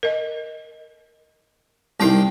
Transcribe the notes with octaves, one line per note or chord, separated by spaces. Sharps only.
A#4 D#5
C2 D#3 C4 E4 G5